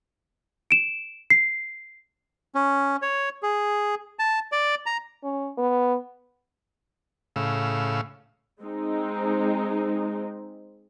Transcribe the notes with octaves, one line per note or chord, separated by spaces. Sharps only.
D7 E7
C7
C#4
C#5
G#4
A5
D5
A#5
C#4
B3
A2 C#3 F5 E6
G#3 C4 D#4